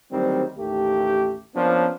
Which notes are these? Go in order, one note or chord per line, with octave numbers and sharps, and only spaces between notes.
D2 D#3 F#3 G3 C4
A1 D#2 A3 G4
F3 A#3 B3 C#4 D4